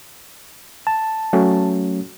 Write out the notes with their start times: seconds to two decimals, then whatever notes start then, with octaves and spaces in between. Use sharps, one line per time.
0.87 A5
1.33 F#3 A3 C#4